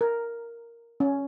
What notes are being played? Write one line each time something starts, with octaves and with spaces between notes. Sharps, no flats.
A#4
C#4